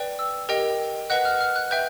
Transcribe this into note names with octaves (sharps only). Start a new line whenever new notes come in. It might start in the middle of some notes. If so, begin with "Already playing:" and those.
Already playing: B4 D5 G5
E6
G4 A#4 D#5 G5
B4 D#5 F#5 F#6
F6
F6
F#6
B4 E5 G5 G6